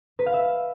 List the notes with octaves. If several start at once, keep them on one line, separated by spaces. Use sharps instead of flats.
B4
F5
E5